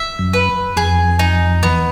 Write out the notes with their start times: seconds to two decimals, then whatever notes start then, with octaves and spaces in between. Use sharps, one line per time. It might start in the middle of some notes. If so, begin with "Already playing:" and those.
Already playing: E5
0.19 F#2
0.33 B4
0.76 F2 G#4
1.19 D#4
1.63 E2 B3